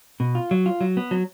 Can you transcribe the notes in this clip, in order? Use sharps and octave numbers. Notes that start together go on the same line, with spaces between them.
B2
F4
F#3
F4
F#3
B3
F#3